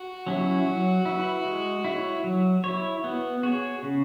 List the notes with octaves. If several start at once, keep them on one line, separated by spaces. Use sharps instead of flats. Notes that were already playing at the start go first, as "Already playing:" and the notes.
Already playing: F#4
F#3 C#4 E4
F#3
E4 B4
G#3
E4 C#5
F#3
E4 C#5
B3 F#4
F#4 G#4 C#5
C#3